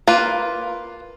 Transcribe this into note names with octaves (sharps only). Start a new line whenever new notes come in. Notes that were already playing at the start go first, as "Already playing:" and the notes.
A#3 F4 B4